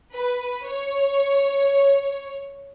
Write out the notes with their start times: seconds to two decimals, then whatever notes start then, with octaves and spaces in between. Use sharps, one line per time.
0.14 B4
0.65 C#5